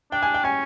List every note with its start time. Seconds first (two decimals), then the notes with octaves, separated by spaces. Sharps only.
0.12 D4 G5
0.22 G#5
0.34 G5
0.44 C#4 G#5